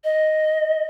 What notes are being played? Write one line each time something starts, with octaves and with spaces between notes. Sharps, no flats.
D#5